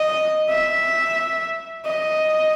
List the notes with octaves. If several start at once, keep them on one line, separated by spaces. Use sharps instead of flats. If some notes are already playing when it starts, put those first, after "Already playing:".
Already playing: D#5
E5
D#5